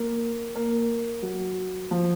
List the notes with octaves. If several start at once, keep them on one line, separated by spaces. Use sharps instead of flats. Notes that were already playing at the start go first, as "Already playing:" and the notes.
Already playing: A#3
A#3
F#3
F3